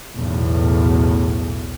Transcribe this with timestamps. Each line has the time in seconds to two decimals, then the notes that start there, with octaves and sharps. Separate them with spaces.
0.17 B1 E2 A2